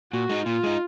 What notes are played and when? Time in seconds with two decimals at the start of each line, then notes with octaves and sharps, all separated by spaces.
0.12 A#2 F#4
0.29 G#3 D#4
0.46 A#2 F4
0.64 G#3 D#4